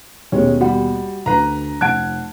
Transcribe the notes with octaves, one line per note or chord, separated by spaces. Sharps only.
D#2 B2 G#3 A#3 C#4
G3 F#4 F#5
D2 D3 B4 A#5
F1 F#5 A5 F#6 G#6 D7